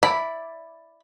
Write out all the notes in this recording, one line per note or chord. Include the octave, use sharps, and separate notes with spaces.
E4 D5 B5